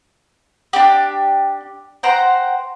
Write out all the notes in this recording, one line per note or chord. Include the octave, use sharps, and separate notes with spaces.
D4 G4
C5 F#5 G5 A#5